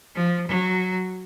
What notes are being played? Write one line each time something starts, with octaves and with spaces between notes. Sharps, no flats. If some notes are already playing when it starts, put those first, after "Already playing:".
F3
F#3